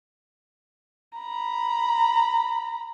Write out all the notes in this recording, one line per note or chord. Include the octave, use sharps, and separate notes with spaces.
A#5 B5